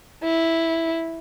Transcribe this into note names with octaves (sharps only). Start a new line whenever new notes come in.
E4